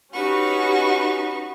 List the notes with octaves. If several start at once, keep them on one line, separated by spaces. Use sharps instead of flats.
C#4 D#4 F#4 G4 B4 C#6